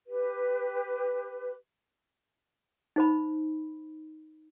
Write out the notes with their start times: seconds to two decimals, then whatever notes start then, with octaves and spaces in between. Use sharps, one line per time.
0.07 G4 B4
2.96 D#4 C5 B5